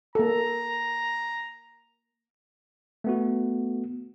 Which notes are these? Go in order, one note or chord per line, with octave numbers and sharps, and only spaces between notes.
A#3 A4 A#5
A3 B3 F#4